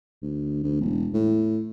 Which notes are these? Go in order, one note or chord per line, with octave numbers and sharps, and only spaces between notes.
D2
D2
E1
A2